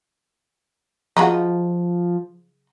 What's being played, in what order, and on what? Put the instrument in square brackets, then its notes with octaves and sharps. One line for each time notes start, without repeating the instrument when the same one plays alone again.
[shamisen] C#3 F#3 D#4 [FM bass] F3